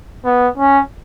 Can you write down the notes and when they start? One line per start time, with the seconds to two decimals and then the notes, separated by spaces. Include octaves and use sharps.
0.25 B3
0.57 C#4